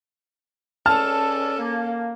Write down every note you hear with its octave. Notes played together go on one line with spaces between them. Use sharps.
C#2 C#4 A4 D5 A5 E6 F6
A#3